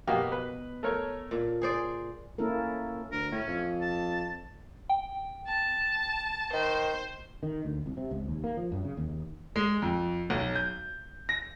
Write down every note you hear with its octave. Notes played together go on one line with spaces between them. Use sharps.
B2 A#3 F#4 G4
B4
A3 A#4 C#5
A#2
G#4 C5 D5
A#3 C#4 E4 A4 A#4
D2 A#4
A2 C#4
F2
A5
G5
A5
D#3 C5
D#3
D2
C2
C3
C#2
D#2
A#3
F3
F#2
C#3
D#2
G#3
F2
B1
G6
A#6